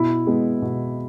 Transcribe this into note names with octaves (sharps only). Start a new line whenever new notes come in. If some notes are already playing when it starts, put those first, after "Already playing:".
Already playing: B2 E4
G#3 B3
B2